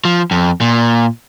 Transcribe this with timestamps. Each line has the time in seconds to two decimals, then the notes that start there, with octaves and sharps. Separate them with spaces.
0.05 F3
0.31 F2
0.61 A#2